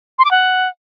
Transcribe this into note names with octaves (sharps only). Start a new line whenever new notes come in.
C6
D6
F#5